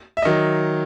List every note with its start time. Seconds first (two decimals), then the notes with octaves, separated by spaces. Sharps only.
0.17 E5
0.22 D#3 F#3 D#5